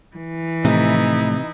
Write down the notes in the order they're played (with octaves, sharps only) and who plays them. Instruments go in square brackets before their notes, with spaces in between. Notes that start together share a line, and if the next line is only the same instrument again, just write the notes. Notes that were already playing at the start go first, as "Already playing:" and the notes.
[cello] E3
[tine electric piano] A2 F3 A3 [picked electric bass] C3 [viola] D#4 E4